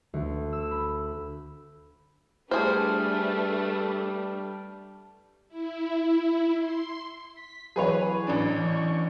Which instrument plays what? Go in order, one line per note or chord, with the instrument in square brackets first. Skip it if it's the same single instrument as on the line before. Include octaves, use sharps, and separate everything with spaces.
[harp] D2
E6
B5
[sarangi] G3 [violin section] A3 D4 B4 [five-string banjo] G#4 C5 [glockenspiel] A5 F6
[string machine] E4
C6
[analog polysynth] B6
[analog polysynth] E3 F#3 [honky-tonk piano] G#4 B4 C#5
[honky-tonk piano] A1 D4
[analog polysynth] E3 C#6